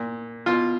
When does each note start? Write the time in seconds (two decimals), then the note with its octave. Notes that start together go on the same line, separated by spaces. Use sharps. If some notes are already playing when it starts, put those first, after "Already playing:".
Already playing: A#2
0.46 B2 F4